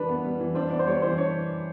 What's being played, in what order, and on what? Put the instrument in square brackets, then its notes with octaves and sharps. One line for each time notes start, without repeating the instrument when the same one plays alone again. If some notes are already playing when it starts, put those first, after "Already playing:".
Already playing: [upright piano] E3 G3 D4 [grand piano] A#4 B4
[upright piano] B3
G3
E3
[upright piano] D4 [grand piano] C5
[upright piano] B3 [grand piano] D5
[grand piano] C5
[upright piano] G3 [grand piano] C#5
[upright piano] E3 [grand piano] C5
[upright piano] D4 [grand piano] C#5